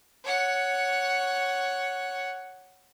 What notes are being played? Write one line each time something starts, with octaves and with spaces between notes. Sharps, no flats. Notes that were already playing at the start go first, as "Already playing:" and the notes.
C#5 F#5